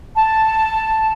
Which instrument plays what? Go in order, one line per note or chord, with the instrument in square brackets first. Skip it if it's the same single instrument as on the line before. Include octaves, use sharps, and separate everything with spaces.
[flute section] A5